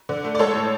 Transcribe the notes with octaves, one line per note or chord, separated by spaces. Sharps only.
D3
A3
D5
G#3 A4 C#5
A2